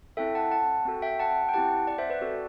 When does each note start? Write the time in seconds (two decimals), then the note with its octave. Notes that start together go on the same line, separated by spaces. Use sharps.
0.17 C4 E4 A4 E5 G5
0.35 F#5 A5
0.51 F#5 A5
0.85 C4 F#4 A4
1.02 E5 G5
1.19 F#5 A5
1.49 G5
1.53 C4 E4 G4 F#5 A5
1.87 D5 F#5
1.98 C5 E5
2.10 B4 D5
2.21 C4 F#4 A4